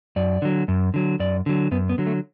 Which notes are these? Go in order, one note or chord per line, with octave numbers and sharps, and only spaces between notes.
F#2 D5
D3 F#3
F#2
D3 F#3
F#2 D5
D3 F#3
F#2 B3
B3
D3 F#3
A3